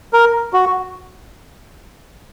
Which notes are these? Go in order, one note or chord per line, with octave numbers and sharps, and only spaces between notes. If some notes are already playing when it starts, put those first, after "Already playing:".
A#4
F#4